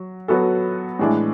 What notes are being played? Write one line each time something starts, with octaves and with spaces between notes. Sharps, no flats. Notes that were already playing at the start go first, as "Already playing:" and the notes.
Already playing: F#3
F#3 B3 F#4 A4
A2 E3 G#3 D4